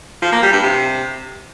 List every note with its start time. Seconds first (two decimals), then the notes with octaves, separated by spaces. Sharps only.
0.22 F3
0.32 A#3
0.43 G3
0.53 G2
0.63 C3